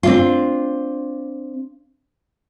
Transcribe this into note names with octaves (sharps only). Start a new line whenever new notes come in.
C4 D4 F4